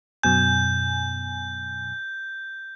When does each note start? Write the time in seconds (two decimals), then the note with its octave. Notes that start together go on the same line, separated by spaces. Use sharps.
0.23 F#2 B2 G#5 G6